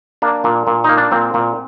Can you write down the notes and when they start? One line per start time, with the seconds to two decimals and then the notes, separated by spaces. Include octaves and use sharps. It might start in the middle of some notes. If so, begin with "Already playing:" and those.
0.22 A#3 D4
0.44 A#2
0.67 A#2
0.84 A#3 D#4
0.97 D4
1.11 A#2 C4
1.34 A#2